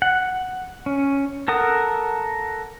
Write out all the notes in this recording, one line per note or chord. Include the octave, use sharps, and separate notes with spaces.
F#5
C#4
A4 A#4 F#5 D#6